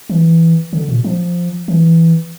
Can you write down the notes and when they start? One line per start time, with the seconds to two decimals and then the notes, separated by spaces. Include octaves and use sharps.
0.10 E3
0.73 D3
0.89 A#2
1.04 F3
1.68 E3